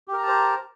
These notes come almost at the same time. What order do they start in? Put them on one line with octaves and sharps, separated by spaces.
G4 A#4 A#5 A5 C5